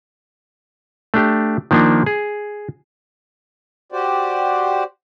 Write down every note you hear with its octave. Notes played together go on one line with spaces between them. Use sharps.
A3 D4 G4
D#3 F3 A#3 D4
G#4
F#4 G4 C5 D5